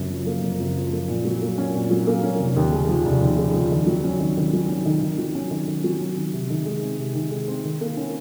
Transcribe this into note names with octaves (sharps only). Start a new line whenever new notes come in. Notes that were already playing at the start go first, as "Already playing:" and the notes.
Already playing: F#1 F#2
F3
A#3
F#1
F#2
F3
A#3
A#2
F#3
A#3
C#4
A#2
F#3
A#3
C#4
F1
D#2
C#3
F3
F1
D#2
C#3
F3
D#3
F#3
C#4
D#3
D#3
F#3
C#4
D#3
D#3
F#3
C#4
D#3
D#3
F#3
C#4
D#3
C3
D#3
G#3
C4
C3
D#3
G#3
C4
D#3
A#3
C#4